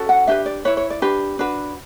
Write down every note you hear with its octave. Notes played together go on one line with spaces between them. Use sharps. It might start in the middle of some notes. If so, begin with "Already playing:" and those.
Already playing: C#4 F#4 A4
F#5
D4 G4 B4 E5
D5
E4 B4 C#5
C#5
D5
D4 G4 B4
D4 F#4 B4